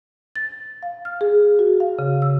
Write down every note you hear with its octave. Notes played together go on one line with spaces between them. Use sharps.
A6
F5
F6
G#4
F#4
F5
C#3
E6